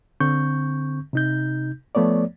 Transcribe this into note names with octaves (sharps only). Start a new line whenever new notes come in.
D3 C4 C#6 G6
C3 D#4 G6
F3 A3 B3 C#5 D5